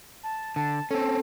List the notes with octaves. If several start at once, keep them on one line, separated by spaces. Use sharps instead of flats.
A5
D3 A5
C4 C#4 A4